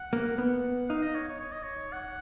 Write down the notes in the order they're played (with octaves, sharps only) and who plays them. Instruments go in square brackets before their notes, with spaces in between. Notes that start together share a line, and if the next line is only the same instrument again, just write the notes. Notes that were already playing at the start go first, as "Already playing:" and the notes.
Already playing: [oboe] F#5
[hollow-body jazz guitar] A#3
[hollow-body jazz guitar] B3 [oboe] F#5
[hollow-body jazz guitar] D#4 [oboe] F5
[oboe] D#5
C#5
C#5
C#5
D#5
C#5
F#5